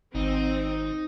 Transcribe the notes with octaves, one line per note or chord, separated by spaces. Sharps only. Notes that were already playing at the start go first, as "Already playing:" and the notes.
G#1 C4 D#4